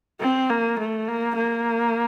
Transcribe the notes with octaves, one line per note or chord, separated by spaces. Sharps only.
C4
A#3
A3
A#3
A#3